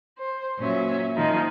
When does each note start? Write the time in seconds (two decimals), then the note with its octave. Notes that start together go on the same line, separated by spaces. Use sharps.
0.17 C5
0.58 A#2 F#3 C#4 E5
1.16 A#2 D#3 F3 G#3 D#4